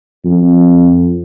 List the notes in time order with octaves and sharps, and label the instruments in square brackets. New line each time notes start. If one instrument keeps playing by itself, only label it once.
[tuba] F2